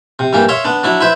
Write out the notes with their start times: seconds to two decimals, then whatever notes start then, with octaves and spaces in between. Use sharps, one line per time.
0.19 C3
0.33 G2 E3 A#3 G4
0.49 C#5 E5 F5 C6
0.64 B3 D4
0.83 F#3 D4 E4
1.01 E4 B4 C5 E5